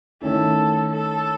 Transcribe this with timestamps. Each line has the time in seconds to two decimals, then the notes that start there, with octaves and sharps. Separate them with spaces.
0.22 D#3 A3 C#4 E4 A4
0.92 A4